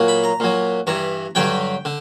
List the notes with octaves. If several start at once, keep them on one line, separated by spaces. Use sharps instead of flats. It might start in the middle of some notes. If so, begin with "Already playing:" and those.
Already playing: A#2 F#3
B5
A#5
A#2 F#3
G2 E3 A#5
G2 D3 F#3 G5
D3